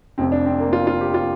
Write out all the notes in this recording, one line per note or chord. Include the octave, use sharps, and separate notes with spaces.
F1 F2 C3 C4
D4
C4
A#3
F4
F4
G4
F4